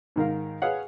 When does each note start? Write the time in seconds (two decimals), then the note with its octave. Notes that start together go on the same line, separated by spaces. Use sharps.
0.16 G#2 D#3 A#4 F5
0.62 G#4 B4 C#5 F5 F#5